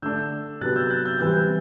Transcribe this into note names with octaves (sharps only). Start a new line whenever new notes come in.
D3 A3 D4 E6 G6
C3 F#3 B3 D4 F#6 A6
E6 G6
F#6 A6
E6 G6
E3 G3 C4 E6 G6